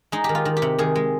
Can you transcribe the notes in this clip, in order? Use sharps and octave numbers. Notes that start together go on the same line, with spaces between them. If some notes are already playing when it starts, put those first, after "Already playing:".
G#3 D#4
G4
D#3
F4
D#3
G4
C3
D#3 G#4
G#3